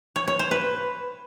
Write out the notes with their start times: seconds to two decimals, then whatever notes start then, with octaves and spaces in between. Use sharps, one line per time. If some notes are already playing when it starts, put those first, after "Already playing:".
0.16 C#5
0.28 C#5
0.39 C5
0.51 B4